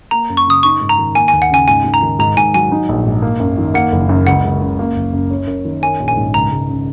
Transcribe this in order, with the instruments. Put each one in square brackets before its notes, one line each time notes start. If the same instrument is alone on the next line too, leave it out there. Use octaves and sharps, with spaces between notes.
[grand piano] A#3 [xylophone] A#5
[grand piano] F#2
[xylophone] C#6
[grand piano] C#3 [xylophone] D#6
[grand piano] D#4 [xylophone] C#6
[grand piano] G#2
[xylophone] A#5
[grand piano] D#3
[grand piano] A#3 [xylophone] G#5
[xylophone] G#5
[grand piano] D#2
[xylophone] F#5
[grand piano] C#3 [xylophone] G#5
[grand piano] G#2 [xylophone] G#5
[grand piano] G#2
[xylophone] A#5
[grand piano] D#3
[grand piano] G#2 [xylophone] A#5
[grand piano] G#2 [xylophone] G#5
[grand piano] F#3 [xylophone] G#5
[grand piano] D#4
A#1
G#2
A#3
F#2
D#3
[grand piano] A#3 [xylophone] F#5
[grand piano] F#1
F#2
[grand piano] C#2 [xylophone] F#5
[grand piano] C#2
C#3
A#3
F#1
F#2
C#4
F#2
D#3
[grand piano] C#4 [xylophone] G#5
[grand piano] A#1
[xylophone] G#5
[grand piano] G#2
[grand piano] C#2 [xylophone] A#5
[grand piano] C#2
C#3